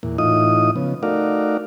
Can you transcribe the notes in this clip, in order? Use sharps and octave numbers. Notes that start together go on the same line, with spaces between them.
E2 A#2
A2 E3 D#4 F4 D#5 D#6
C#3 F3 B3
A3 D#4 F#4 A#4 D5 F5